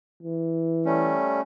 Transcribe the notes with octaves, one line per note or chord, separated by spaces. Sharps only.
E3
G3 A3 C#4